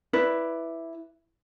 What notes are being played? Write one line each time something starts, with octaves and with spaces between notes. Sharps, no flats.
E4 B4 D5